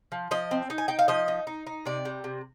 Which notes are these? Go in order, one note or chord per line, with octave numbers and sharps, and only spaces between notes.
F3
F3 D#5
C4
D#4
G#5
D#4 G5
F5
F3 D#5
D#4
D#4
D#4
C3 D5
G3
C3